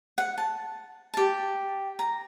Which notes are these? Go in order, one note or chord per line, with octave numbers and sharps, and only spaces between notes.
F#5
A5
G4 A5
A#5